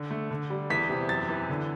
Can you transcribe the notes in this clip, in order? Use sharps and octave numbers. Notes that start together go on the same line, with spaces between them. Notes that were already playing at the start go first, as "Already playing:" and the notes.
Already playing: D3
A3
D3
G3
E2 B6
C3
F#2 A6
E3
D3